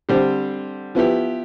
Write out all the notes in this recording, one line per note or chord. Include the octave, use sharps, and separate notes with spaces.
D3 G3 C4 G4 C5
F3 B3 E4 G4